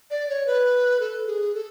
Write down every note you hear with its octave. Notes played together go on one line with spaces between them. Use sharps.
D5
C#5
B4
A4
G#4
A4